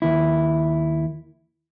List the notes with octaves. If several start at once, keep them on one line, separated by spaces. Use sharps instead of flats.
D#2 E4